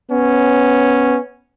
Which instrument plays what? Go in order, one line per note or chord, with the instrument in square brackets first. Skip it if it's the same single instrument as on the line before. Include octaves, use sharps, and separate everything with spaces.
[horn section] B3 C#4